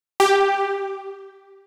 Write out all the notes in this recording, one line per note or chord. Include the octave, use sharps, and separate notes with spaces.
G4